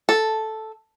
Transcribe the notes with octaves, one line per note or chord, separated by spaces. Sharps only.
A4